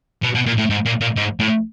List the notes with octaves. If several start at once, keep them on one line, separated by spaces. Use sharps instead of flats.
B2
B2
A#2
A2
G#2
A#2
A#2
G#2
A2